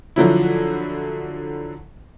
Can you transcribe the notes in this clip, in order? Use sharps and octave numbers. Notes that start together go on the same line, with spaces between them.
D3 F3 F#3 E4